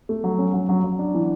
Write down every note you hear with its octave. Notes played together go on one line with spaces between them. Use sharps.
A3
F#3
C#4
F#3
F#3
F#3
D4
E3